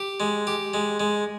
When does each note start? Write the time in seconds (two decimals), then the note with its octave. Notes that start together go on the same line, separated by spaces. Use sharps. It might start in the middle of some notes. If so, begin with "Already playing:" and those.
Already playing: G4
0.20 G#3
0.47 G4
0.74 G#3
1.00 G#3